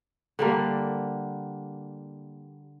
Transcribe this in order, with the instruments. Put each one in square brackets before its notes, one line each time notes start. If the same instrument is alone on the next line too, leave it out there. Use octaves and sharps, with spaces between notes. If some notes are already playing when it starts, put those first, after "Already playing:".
[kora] D3 G3 A#3